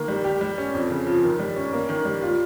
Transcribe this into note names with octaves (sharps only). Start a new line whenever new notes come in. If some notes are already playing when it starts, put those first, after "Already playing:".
Already playing: D#3 A#3
G3
G4
G3
C#4
F2
C#3
F3
D#3
G3
C#4
A#3
D#3
G3
F4